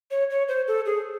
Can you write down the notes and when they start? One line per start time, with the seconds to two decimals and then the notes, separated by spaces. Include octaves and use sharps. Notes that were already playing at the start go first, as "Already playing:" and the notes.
0.11 C#5
0.30 C#5
0.48 C5
0.68 A4
0.86 G#4